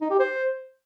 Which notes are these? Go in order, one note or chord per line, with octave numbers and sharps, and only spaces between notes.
D#4
G4
C5